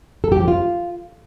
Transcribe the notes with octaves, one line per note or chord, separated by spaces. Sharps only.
A4
G4
F3
F4